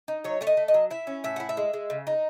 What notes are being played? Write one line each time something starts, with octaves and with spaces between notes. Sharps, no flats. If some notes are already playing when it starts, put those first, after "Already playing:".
D#4
F#3 C#5
A3 C#5
D#5
A3
D#5
F#3
E4 E5
C#4
A2 E5
E4 F#5
E5
G#3
G#3
C#3
D#4